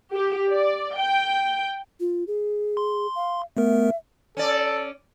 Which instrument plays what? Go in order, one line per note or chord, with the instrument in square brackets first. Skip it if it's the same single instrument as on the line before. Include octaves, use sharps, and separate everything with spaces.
[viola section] G4
D5
G5
[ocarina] F4
G#4
[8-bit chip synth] C6
[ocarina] F5
[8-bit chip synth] A3 B3 A#4 [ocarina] E5
[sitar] C#4 D5 [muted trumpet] A4